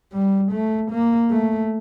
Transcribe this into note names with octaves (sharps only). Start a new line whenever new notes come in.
G3
A3
A#3
A3